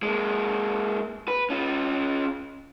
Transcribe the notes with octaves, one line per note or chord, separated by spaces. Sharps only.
G#3 A#3
B4
C#4 F4